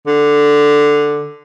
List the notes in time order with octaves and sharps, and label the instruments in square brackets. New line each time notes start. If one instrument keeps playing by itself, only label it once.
[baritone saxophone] D3